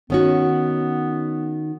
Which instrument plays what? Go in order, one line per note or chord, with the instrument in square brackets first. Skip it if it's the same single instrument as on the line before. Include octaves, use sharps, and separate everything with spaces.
[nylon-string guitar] D#3 C#4 F#4 [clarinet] B3